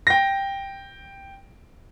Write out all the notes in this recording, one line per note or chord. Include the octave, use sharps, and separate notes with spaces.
G5 A#6